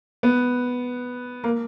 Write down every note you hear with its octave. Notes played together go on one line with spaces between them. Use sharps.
B3
A#3